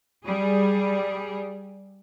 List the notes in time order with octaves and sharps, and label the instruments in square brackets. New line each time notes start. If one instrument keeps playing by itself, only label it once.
[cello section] G3 G#4